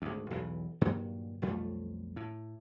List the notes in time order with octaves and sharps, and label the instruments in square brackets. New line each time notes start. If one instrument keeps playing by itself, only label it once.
[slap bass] G#1 D2
B1 E2 E3
G2 A#2 D#3 F#3
B1 F2 G3 A3
A2